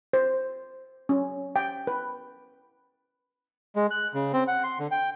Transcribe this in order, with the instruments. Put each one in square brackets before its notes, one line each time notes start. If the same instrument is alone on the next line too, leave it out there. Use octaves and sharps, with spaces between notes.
[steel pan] C5
C#4
G5
B4
[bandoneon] G#3
F#6
C#3
C4
F#5
C6
D3
G5